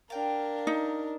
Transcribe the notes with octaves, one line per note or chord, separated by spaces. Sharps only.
D4 A#4 F5 G5
D#4